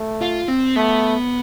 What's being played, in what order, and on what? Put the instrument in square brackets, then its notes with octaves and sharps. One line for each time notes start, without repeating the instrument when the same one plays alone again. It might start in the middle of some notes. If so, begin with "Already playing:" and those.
Already playing: [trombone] A3
[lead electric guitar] F4
C4
[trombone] A3 [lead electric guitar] B3